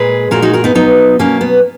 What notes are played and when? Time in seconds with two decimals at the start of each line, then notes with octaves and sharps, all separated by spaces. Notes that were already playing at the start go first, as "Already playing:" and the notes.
Already playing: A#2 G#3 G#4 B4
0.31 A#2 G#3 F#4 A#4
0.42 D#4 F#4
0.53 F#4 A#4
0.64 B3 D#4
0.75 B2 F#3 B3 D#4
1.19 B2 F#3 A#3 C#4
1.41 B3